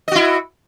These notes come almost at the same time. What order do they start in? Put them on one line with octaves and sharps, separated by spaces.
D#5 F#4 E4